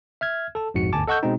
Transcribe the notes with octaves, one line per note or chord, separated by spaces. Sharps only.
E5 F6 G#6
A4 A5
A#1 F2 G#2 F#4 C#7
G1 D2 G#5 A5 D6
A4 D#5 F#5 C#6 E6 G6
B2 G#3 C4 D#4